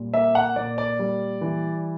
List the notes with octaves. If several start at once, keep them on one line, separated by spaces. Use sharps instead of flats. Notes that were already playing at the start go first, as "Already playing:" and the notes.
Already playing: A#2 G3
A#3 E5
F#5
A#2 D5
D5
G3
E3